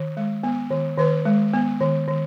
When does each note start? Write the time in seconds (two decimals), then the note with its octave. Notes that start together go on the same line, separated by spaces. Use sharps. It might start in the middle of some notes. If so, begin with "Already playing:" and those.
Already playing: D#3
0.17 G#3
0.43 B3
0.70 D#3
0.98 D#3 B4
1.25 G#3
1.54 B3
1.80 D#3
2.08 D#3